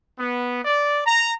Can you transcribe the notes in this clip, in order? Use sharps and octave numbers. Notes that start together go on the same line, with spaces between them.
B3
D5
A#5